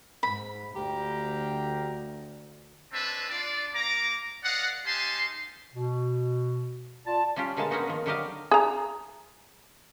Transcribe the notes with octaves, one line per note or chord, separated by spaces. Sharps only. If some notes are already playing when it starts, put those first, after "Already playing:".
G#2 B5
D2 G4 F5 G5 A#5
G#3 C4 D4 B4 E5 A5
D4 F4 D5
A#3 A#5 D6
A#4 D5 D#5 F5 F#5
D#4 G4 F5 G#5 A5 C6
B2
F4 D5 A5
G3 C#4 F4 G4
B2 D3 G#3 A#3 A5
G#3 A#3 B3 C#4 D#4 F#4
D#3 F3
D3 F#3 G3 G4 D#5 F5
G#4 A#5